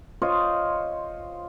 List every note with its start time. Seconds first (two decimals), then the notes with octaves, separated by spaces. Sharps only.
0.22 F4 C5 C#5 D#5